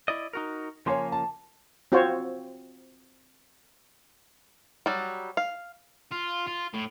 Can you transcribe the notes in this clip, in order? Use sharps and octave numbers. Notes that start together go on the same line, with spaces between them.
E4 D5 D#5
D#4 F#4 A#4
C#3 F3 A#3 C#5 G#5 C6
A5
C4 F4 F#4 C5 C#5
F#3 G3
F5
F4
F4
A2